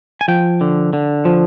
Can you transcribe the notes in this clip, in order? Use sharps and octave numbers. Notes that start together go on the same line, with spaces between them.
G#5
F3 G5
D3
D3
F3